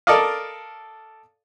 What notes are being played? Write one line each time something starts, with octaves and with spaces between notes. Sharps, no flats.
A4 A#4 D5 D#5 F5